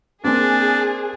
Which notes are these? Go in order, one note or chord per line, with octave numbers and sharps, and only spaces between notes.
A#3 C4 D4 G#4